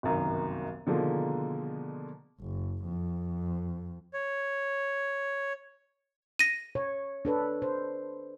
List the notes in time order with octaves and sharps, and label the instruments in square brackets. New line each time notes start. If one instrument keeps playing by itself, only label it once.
[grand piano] G1 C2 F#2 D#3
B2 D3 D#3 F3 G#3 A#3
[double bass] F#1
F2
[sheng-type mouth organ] C#5
[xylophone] A#6 D#7
[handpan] C#5
D4 A4 B4
C5